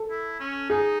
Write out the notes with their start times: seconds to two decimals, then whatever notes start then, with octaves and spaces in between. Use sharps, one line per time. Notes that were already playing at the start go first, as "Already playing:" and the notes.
Already playing: A4
0.10 E4
0.40 C#4
0.70 D#4 G#4